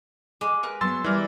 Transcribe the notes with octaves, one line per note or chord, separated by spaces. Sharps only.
G#3 D6
A#4 B4 F#6
F#3 B3 C6 E6 A6
E3 G3 A#4 D5